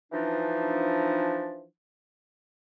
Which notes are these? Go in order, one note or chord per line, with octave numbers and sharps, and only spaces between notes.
E3 F3 D4 D#4